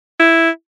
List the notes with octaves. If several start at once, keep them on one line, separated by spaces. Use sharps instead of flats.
E4